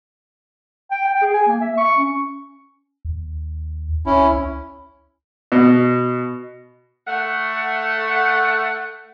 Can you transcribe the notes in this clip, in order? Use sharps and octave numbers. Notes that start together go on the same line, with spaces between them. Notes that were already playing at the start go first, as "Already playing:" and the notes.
G5
G5
G#4
G#5
A#3
E5
C#6
C#4
D#2
C#2 C#4 E4
B2
A3 F#5